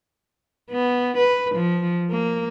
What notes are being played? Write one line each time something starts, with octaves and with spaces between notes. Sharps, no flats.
B3
B4
F3
A#3